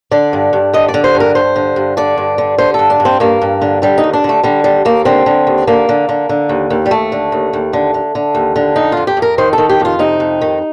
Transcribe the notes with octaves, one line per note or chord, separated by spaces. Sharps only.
D3 D5
G2
G2
D3 D#5
D5
D3
C5
G2
A#4
G2 C5
D3
G2
D3 D5
G2
D3
D3 C5
A4
G2
D4
G2
C4
G2 A#3
G2
D3
D3 G3
D#4
D#2
D4
D3 A3
D3 G3
D#2 G3
D#2 A#3
D3 C4
D3
D#2
D3 A#3
D3
D3
D3
D#2
D#2
G3
D#2 A3
D3
D#2
D#2
D3
D3
D3
D#2
D3
F2 D#4
F2 F4
G4
F2
A#4
D#3 C5
A4
D#3
G4
F2
F4
C3 D#4
F2
D#3